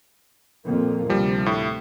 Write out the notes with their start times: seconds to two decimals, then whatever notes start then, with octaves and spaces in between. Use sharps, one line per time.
0.66 F2 A#2 A#3
1.09 D2 C3 F3 G3
1.46 A2